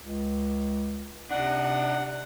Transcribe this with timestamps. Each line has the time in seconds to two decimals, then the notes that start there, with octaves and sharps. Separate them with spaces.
0.03 C#2
1.31 C3 D4 D#4 F#5